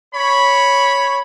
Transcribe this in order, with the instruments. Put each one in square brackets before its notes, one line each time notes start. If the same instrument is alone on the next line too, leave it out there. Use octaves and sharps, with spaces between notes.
[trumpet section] C#5 B5